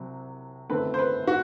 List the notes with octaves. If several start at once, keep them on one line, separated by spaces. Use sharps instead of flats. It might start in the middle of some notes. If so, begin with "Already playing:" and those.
Already playing: C2 C3 F#3
G1 F#2 D#3 A3 C4 B4
C5
B4
F#4